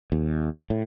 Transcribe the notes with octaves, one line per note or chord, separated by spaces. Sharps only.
D#2
A2